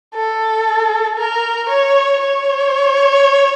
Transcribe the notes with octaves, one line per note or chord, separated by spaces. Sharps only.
A4
A#4
C#5
C#5